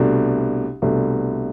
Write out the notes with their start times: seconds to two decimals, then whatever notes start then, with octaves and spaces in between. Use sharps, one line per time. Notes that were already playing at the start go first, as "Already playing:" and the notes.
Already playing: C2 B2 A3 D4
0.82 C2 B2 A3 D4